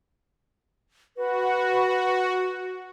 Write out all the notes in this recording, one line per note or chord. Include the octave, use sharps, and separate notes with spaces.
F#4 B4